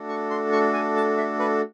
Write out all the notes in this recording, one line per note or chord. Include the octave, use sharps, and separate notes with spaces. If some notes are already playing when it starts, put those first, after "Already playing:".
Already playing: A3 D4 F#4 A4
C#6
C6
C#6
G#5
A5
E5
B4